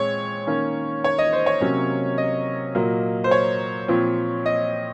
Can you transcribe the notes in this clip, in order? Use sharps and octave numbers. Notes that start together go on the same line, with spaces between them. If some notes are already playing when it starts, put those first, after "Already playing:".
Already playing: A#2 G#3 C4 C#5
D#3 A#3 C#4
C#5
D#5
C5
C#5
C3 F#3 A#3 C#4
D#5
A#2 F#3 A#3
C5
C#5
A#2 F3 C4
D#5